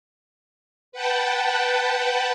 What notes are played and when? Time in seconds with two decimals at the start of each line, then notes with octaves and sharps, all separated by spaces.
0.92 B4 F#5 G5 A5